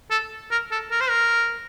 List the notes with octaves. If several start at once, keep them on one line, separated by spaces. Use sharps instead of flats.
A4
A#4
A4
A#4
C5
A#4